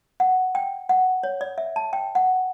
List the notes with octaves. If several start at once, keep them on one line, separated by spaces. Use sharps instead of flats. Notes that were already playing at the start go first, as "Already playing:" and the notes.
F#5
G5
F#5
C#5
D5
E5
A5
G5
F#5